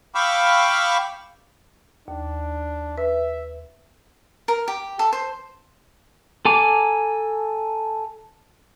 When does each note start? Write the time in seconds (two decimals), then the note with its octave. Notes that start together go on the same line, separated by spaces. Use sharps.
0.15 F5 G5 B5 C#6 D6 E6
2.08 D#2 D4
2.98 B4 E5
4.48 A#4
4.68 G4
4.99 A4
5.13 C5
6.45 A4 G#5 A#5 D6